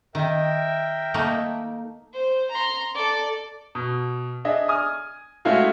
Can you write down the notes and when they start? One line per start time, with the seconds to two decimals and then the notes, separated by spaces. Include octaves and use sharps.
0.15 D#3 A#4 E5 G5
1.14 A3 A#3 D#4
2.14 C5
2.51 A#5 C6
2.95 A4 D5
3.75 B2
4.45 D4 G#4 D#5 E5
4.68 G#5 D#6 F6
5.45 G#3 A3 C#4 E4 F#4 F5